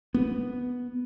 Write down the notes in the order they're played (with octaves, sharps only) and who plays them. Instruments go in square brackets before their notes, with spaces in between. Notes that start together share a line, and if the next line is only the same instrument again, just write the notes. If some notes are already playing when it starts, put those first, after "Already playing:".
[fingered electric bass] B3